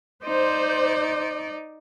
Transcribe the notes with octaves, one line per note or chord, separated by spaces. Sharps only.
D#4 C5 D5